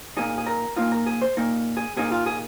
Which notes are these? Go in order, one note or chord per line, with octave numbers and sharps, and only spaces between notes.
A#2 A#3 D#4 G#4
G#4
A#4
A#2 A#3 D#4 F4
A#4
G#4
C5
A#2 A#3 D#4
G#4
A#2 A#3 D#4 G#4
F4
G#4